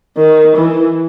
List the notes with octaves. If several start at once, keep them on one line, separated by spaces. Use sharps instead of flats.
D#3
E3